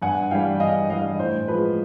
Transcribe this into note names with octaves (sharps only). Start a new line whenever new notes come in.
G2 F#5 G#5
E3 G3 F5 G5
G2 D#5 F5
E3 G3 D#5 F5
A2 C5
F3 G#3 B4